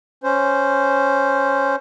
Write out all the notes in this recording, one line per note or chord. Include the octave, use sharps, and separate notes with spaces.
C#4 C5